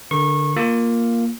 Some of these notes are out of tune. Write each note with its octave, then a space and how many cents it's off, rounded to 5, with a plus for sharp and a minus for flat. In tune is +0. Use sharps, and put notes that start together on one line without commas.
D3 +0 A#4 +20 C#6 -25
A#3 +0 F4 +0